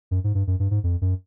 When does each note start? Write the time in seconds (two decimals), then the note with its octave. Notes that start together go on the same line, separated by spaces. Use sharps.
0.11 F#2
0.24 G#2
0.35 G2
0.47 F#2
0.60 G2
0.71 G#2
0.84 F2
1.01 F#2